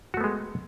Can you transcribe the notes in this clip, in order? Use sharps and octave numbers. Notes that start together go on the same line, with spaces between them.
G#3 A3 B3 F#4